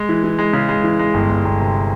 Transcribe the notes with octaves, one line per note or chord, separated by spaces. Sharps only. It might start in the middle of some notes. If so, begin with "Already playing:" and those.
Already playing: G#3
E3
E3
G#3
C#3
G#3
E3
G#3
G1
G1
G1
C3